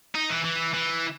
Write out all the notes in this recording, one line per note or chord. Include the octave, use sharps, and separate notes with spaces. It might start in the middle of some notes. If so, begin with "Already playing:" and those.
D#4
E3
E3
E3